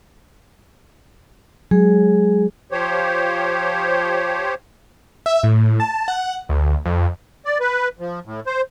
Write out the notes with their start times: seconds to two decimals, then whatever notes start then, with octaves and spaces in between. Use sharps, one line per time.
1.71 F#3 G#3 G#4
2.72 F3 G4 C5 C#5
5.26 E5
5.43 A2
5.80 A5
6.08 F#5
6.49 D2
6.86 F2
7.45 D5
7.60 B4
7.99 F3
8.26 A2
8.46 C5